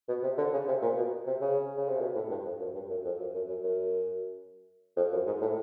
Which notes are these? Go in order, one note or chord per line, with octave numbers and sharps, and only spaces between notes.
B2
C3
D3
C#3
C3
A#2
B2
C3
C#3
C#3
C3
B2
A2
G2
F2
F#2
G2
F#2
F2
F#2
F#2
F#2
F#2
F2
F#2
G#2
A2